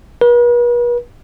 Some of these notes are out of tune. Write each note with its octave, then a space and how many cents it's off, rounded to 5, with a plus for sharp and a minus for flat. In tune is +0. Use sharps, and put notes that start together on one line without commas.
B4 -45